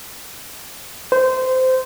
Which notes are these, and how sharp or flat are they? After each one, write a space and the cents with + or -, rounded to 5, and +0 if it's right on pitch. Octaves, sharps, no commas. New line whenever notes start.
C5 -20